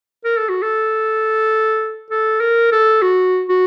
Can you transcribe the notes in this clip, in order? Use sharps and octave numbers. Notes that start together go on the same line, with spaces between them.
A#4
A4
F#4
A4
A4
A#4
A4
F#4
F#4